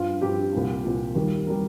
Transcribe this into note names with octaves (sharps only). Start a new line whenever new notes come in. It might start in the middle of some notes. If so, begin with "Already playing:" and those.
Already playing: G2 F3 F4
G2 F3 G4
C2 A#2 F3
C2 A#2 F3
D#2 D#3 G3
D#3 G3 A#4